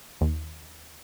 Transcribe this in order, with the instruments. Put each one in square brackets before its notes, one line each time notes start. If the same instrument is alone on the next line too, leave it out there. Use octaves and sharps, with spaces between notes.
[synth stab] D#2